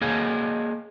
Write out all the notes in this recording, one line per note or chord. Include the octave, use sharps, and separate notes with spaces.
A#3 G#4 C#5 D#5 F5